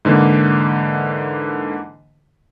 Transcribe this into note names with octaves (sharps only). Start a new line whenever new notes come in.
G#2 D3 E3 A#3